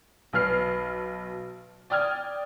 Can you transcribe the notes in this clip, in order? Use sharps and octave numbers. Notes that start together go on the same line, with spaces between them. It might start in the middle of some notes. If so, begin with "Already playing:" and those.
B1 F#3 B4 F6 C7
D5 G5 D#6 F6 G#6